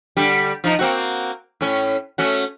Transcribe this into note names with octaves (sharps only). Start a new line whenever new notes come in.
D3 G3 G4
F3 D#4
A#3 C4 F#4
A2 C#4
A3 C#4 F#4